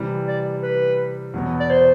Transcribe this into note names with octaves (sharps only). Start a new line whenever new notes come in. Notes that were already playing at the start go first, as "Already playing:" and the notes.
Already playing: C3 E3 G3
D5
B4
E2 B2 F#3 B3
D5
C5